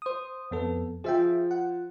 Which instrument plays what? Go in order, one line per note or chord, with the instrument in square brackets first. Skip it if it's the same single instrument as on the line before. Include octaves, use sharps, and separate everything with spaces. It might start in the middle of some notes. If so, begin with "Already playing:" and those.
[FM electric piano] C5 D#6
F2 B3 A4
[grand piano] F3 [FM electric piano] G#4 E5 G5
[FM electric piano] F#5